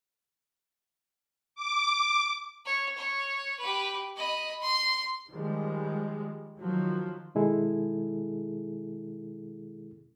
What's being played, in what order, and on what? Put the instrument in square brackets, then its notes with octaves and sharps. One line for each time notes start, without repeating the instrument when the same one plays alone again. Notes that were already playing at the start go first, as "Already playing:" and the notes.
[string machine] D6
[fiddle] C#5
C#5
G4 B4
D#5 B5
C6
[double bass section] D#3 F3 G3 G#3
D#3 F3 F#3
[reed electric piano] B2 D#3 G#3 E4 G#4 A4